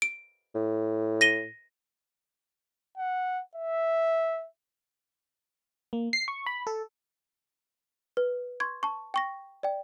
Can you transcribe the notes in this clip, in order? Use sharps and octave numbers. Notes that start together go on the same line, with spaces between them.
D7
A2
A#6 D#7 G7
F#5
E5
A#3
C7
C#6
B5
A4
B4
C6 C#6 G#6
A5 C#6
G5 C#6 A#6
D5 G5